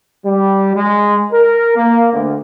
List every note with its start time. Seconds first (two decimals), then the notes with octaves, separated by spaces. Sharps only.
0.25 G3
0.75 G#3
1.32 A#4
1.76 A#3
2.13 D2